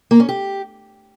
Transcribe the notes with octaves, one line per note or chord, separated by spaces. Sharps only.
A#3
C#4
G4